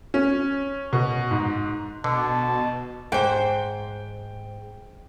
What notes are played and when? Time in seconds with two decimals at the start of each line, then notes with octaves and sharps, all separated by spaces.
0.14 C#4
0.93 B2
1.31 G#2
2.04 B2 D3 A5
3.12 G#2 C5 G5